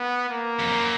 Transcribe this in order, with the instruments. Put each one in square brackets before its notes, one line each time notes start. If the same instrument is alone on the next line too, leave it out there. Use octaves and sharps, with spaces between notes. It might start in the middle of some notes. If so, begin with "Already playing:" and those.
Already playing: [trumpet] B3
A#3
[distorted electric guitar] F2
F#2